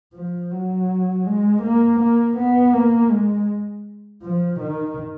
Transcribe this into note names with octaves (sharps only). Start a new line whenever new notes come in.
F3
F#3
G#3
A#3
A#3
B3
A#3
G#3
F3
D#3